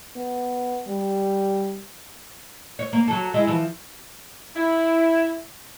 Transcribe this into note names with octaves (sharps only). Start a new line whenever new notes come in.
B3
G3
C#5
A#3
F#3 A4
G#3 E4 D#5
E3 F3
E4